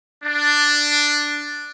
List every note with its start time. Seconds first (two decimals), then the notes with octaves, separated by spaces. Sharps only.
0.25 D4